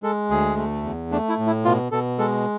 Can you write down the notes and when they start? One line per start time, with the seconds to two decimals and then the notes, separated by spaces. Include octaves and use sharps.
0.03 G#3 A4
0.30 D2 G#4
0.57 A3
0.83 E2
1.11 A3 D4
1.29 E4
1.39 A2
1.46 E4
1.64 B2 F4
1.92 B2 A4
2.18 G#3 A4